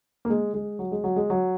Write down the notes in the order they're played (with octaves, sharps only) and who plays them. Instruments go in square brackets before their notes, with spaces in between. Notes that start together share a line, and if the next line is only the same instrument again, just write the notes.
[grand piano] A#3
G#3
G#3
F#3
G#3
F#3
G#3
F#3